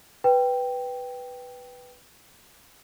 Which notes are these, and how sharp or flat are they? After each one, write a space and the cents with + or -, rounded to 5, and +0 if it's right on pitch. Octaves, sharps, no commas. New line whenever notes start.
B4 +0 G5 +0